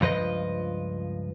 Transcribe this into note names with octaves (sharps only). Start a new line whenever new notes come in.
C#2 G2 F3 B4 D#5